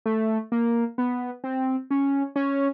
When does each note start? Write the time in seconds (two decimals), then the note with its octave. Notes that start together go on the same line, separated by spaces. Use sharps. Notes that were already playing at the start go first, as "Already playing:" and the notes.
0.06 A3
0.52 A#3
0.98 B3
1.44 C4
1.91 C#4
2.36 C#4